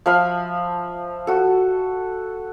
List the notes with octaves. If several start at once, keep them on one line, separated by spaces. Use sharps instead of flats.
F3 E5 F5 B5
F#4 A4